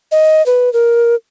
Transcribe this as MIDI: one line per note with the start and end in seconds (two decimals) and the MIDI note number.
0.12 0.44 75
0.46 0.72 71
0.73 1.15 70